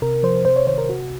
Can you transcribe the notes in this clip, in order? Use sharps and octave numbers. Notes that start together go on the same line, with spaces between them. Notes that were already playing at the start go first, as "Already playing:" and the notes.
C3 A#4
F3 C5
C3 C5
C#5
D#3 C5
A#4
C3 F#4